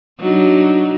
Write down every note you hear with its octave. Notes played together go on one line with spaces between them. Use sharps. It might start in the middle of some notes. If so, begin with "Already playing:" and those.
F#3 D4 D#4